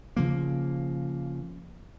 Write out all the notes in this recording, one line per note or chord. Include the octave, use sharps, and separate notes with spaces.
C#3 F3 A#3